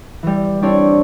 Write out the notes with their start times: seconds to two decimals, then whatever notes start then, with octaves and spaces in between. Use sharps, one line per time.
0.23 E3 G3
0.62 G3 C4 D4 E4 C#5 D5